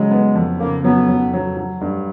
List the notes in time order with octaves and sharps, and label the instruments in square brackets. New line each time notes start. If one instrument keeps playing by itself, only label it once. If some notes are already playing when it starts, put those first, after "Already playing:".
Already playing: [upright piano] C#3 F#3 [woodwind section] G#3
[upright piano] B3
F2
[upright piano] C#3 [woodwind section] A#3
[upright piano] F#3 [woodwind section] B3
[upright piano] F#3
F#3
F#3
G2